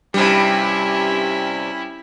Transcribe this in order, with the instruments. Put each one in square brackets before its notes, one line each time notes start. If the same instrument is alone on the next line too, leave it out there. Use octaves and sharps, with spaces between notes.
[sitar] G2 C3 [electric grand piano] G3 [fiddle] C#4 E4